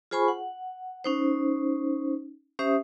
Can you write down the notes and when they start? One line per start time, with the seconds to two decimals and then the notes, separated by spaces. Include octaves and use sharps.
0.11 F4 G#4 C5 G#5 B5 C#6
0.28 F#5
1.04 C#4 D#4 C5
2.59 C#4 G4 C5 E5 D#6